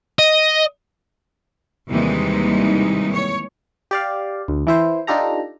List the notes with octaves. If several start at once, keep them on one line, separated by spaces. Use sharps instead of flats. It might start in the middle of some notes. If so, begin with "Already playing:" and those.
D#5
D#2 C3 E3 G3 G#3 D#4
C#5
G4 D5 F5
D2
E3 E4 C5
D4 D#4 F4 G4 A4 A#5